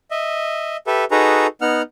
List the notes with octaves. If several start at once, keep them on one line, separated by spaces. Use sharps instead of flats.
D#5 E5
G4 A4 B4 E5
D#4 F#4 G#4 A4 B4 A#5
B3 D#4 F#5 F6